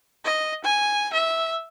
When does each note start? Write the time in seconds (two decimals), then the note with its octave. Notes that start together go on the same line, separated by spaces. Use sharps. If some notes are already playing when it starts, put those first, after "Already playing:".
0.25 D#5
0.64 G#5
1.13 E5